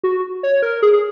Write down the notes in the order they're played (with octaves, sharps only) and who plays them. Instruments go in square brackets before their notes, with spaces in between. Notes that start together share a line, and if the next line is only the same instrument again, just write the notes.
[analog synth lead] F#4
C#5
A#4
G#4
G#4